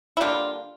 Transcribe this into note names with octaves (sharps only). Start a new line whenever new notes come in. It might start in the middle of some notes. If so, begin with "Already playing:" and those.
E4
D3 G3 A#3 D4 F4